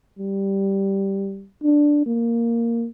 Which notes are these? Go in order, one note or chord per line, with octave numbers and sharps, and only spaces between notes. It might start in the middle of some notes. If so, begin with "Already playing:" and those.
G3
D4
A#3